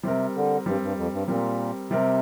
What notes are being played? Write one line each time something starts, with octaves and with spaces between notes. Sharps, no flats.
C3 G3 C4 A#4
D3
G2 G3 C4 A#4
G2
F2
G2
A#2 G3 C4 A#4
C3 G3 C4 A#4